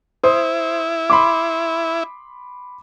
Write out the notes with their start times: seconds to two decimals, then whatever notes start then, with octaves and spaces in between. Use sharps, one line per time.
0.24 E4 C5 D#6
1.10 B5 C6 D6